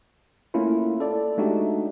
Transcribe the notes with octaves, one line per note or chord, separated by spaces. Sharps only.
A3 A#3 C#4 E4 F4
A4 D5
G#3 A3 D4 D#4 F#4 G4